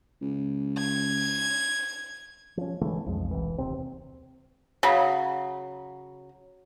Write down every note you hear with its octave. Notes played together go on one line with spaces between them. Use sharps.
C#2
G#6
F3 C#4
D3 E3 G#3 A3
B1 F2 F3 G#3
E1 C2 E3
D1 D#2 C3 C4
C#3 F#3